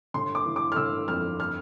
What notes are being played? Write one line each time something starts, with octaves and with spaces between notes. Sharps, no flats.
G1 C6
D6
E3
D6
F6
G1 E6
F2 F6
F6